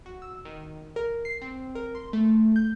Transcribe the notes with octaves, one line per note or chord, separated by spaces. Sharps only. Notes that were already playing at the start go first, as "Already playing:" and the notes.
F#4
E6
D#3
A#4
C7
C4
A#4
C6
A3
G6